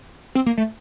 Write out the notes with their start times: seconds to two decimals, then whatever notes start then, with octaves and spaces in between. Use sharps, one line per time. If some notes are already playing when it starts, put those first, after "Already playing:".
0.35 C4
0.46 A#3
0.58 A3